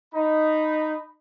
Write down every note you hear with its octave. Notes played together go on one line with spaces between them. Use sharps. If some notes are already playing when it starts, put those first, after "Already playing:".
D#4 B5